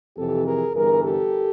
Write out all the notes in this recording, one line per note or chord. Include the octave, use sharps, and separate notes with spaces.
F2 C3 E3 G4 A4
G#4 A#4
G1 G2 E3 G#4 A#4
G4 A4